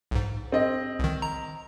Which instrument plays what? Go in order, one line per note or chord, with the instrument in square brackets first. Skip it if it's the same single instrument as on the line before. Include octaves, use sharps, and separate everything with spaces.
[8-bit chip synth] B1 G#2
[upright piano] C4 D#5
[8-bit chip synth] C2 D#3
A#5